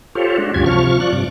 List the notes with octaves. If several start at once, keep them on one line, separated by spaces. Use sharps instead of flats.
F4 G4 A4 C5 C#5
G#3 D4 F#4
D2 G2 C#4 F4 G4 G#6
C3 F3 C#6 F6
F3 D5 C#6 F#6
G2 C3 D6